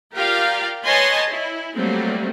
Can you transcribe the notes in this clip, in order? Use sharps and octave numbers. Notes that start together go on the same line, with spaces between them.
F4 G4 A#4 D5 F5 G5
B4 C#5 D#5 G#5 A5 C6
E4
F#3 G3 A3 A#3 C4